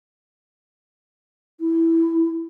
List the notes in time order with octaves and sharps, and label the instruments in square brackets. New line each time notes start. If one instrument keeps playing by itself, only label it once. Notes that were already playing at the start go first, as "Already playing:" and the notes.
[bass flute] E4